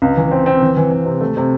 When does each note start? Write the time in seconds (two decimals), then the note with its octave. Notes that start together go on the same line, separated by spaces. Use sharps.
0.02 C#2
0.17 E3
0.31 C4
0.46 C4
0.62 E3
0.77 E3
0.91 E3
1.06 C3
1.21 A3
1.37 C3